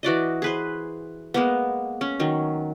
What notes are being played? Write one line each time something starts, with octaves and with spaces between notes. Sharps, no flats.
E3 F#4 D5 D#5
G#4 B4 C5
G#3 A#3 B3
C#4
D#3 F#3